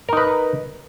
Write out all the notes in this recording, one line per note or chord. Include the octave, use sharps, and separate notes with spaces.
D#4 A#4 B4